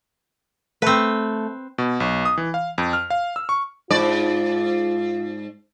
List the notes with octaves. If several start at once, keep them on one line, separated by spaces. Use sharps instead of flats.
A3 C4 B4
B2
B1
D#6
E3
F5
F2
F6
F5
E6
C#6
G#2 F4 D5